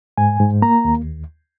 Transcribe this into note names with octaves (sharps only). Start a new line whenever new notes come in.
G#2 G#5
G#2
A#3 A#5
D#2